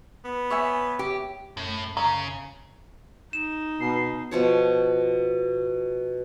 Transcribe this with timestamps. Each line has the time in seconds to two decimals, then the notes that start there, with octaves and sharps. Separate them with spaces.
0.25 B3
0.50 C#5 E5 G#5
0.99 G4
1.57 F#2 A2
1.97 C#3 A#5
3.33 D#4 E7
3.80 B2 C7
4.31 B2 F3 C#5